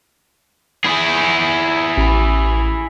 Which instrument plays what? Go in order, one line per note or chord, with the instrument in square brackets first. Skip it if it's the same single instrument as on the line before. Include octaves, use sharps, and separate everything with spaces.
[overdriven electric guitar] E4 G#4
[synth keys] A1 B5